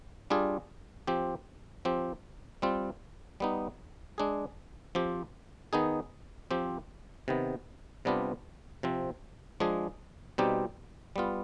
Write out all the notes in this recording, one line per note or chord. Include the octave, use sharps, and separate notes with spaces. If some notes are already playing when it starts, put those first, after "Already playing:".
G3 D4 F4 G#4
F3 C4 G4
F3 C4 G4
G3 C4 F4
G3 B3 D#4
G#3 D4 G#4
F3 C4 G4
D#3 B3 D#4 G#4
F3 C4 G4
C3 D#3 B3
C3 G3 B3 D4 F4
C3 F3 C4
F3 G#3 D4 G#4
B2 G3 C4 D#4 G4
G3 B3 F4